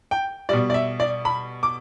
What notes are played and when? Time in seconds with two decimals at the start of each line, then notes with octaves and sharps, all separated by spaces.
0.11 G5
0.49 B2 G3 D5
0.70 D5
0.74 E5
1.00 D5
1.25 B5
1.63 D6